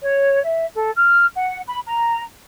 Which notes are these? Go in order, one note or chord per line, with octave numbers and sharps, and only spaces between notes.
C#5
E5
A4
F6
F#5
B5
A#5